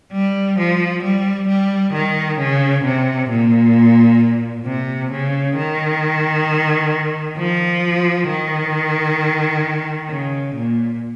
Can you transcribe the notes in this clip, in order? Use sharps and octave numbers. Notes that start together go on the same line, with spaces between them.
G3
F3
G3
G3
D#3
C#3
C3
A#2
C3
C#3
D#3
F3
D#3
C#3
A#2